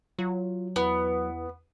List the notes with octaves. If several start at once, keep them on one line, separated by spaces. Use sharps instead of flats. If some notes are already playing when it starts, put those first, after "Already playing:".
F#3 F4
E2 B3 E4 B4